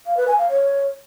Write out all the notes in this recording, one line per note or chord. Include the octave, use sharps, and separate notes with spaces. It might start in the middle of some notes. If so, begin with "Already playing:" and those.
F5
B4
G#5
F5
C#5